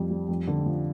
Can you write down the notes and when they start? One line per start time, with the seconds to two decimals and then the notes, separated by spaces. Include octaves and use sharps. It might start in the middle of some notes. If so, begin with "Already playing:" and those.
Already playing: F2 G3
0.10 G3
0.29 F2
0.47 D3
0.66 F3